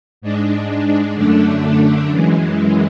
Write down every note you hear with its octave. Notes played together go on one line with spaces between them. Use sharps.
G#2 G#3 D4
F#2 D3 A3 D4
F#2 E3 G#3